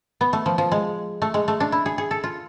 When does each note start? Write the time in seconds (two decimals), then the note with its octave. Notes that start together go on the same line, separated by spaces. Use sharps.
0.21 B3
0.33 A3
0.46 F3
0.58 F3
0.72 G#3
1.22 A3
1.34 G#3
1.48 A3
1.60 D4
1.72 E4
1.86 G#4
1.98 G#4
2.11 A4
2.23 F4